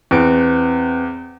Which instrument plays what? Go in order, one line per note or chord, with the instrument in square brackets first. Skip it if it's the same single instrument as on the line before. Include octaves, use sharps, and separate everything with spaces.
[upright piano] E2 [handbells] C4 B4 D7